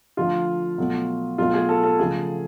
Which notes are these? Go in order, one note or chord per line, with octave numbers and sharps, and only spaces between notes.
D3 F3 A3 F4
B2 F#3 A3
B2 F#3 A3 F4
G#4
A4
A4
C#3 F3 A3 G#4